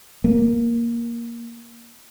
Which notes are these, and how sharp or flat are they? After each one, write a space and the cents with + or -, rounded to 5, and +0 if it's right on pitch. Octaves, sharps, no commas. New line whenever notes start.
A#3 +10